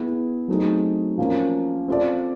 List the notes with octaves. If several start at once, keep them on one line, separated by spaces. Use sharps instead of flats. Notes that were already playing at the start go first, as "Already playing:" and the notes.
Already playing: B3 E4 G#4
F#3 A3 C4 D#4 G#4
F3 A#3 C#4
C4 F4 A4 D5